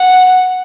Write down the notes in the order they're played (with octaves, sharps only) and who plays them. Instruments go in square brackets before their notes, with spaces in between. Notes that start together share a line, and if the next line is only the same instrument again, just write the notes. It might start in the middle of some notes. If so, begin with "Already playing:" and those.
Already playing: [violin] F#5